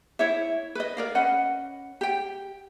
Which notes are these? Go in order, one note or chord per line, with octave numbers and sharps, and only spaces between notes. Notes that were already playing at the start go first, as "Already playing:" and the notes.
E4 C#5 E5
B4 D#5
A#4 D5 F5
C#4 B4 D#5 F#5
G4 G5